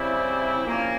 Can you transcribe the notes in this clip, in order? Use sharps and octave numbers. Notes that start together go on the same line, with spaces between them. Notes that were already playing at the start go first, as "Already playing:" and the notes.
Already playing: C#3 G3 C4 E4
A#2 F3 A#3 C#4